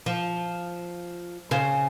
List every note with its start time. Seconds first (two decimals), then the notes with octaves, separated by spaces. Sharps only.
0.06 F3
1.51 C#3 C5